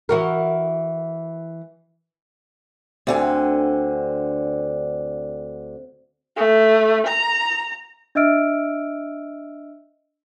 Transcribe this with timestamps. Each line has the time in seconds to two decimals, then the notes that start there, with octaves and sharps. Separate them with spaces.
0.09 E3 F#4 A#4
3.07 D2 D3 C4 F#5 G#5
6.37 A3
7.07 A#5
8.15 D4 D#5 E5 E6 F6 D7